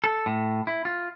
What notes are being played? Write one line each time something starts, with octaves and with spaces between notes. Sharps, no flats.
A4
A2
E4
F4